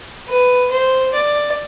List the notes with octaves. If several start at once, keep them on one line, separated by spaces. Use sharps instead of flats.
B4
C5
D5